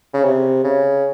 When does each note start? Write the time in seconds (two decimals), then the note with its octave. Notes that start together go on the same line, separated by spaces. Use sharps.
0.14 C#3
0.24 C3
0.64 C#3